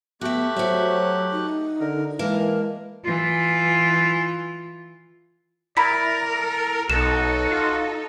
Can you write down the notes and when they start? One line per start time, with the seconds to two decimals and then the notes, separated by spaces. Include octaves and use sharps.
0.21 A3 B3 F#4 G4 E5 F#6
0.57 F#3 F#4 C5 E5
1.32 D#4
1.80 D3 A#4
2.19 E3 G#3 A#3 A#4 A5
3.04 E3 F4
5.77 E4 A#4 D5 A#5 B5 B6
6.32 A4
6.90 B1 D#4 F#4 A4 E7
7.51 F4